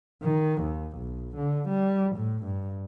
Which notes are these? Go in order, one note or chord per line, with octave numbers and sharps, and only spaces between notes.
D#3
D#2
B1
D3
G3
A2
G2